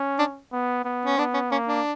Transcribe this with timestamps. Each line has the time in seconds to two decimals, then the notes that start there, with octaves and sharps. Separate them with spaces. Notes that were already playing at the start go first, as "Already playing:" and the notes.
Already playing: C#4
0.19 D4
0.52 B3
0.85 B3
1.05 C#4
1.18 B3 D4
1.34 C#4
1.51 A#3 C#4
1.68 D4